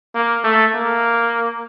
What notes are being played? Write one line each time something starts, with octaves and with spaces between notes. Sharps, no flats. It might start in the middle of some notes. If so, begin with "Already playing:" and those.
A#3
A3
A#3